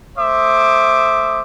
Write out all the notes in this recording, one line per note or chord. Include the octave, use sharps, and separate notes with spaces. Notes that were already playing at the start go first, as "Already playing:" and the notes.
A3 C5 E5 D6 D#6